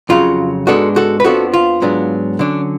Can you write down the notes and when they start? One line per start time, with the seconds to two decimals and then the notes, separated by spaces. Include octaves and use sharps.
0.09 F2 C#3 F#3 F4
0.67 G#2 G#3 B3 D4 F#4 A4
0.96 F#4 A4
1.20 B4
1.24 F2 F3 B3 D4 F#4 A4
1.53 F4
1.82 G#2 F#3 B3 D4
2.39 D3 F#3 C#4 D4